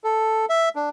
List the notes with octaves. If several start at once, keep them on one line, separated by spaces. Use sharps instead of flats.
A4
E5
D4